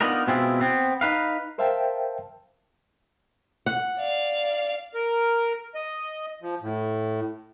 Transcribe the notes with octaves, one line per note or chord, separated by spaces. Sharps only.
B3 D4 D#4 F4 A#4
B2 G#3 C4 E4 F4
B3 C4
D#4 B4 F5
A#4 C5 E5 F5 G5 A5
F#5
D5 F5
A#4
D#5
F3
A2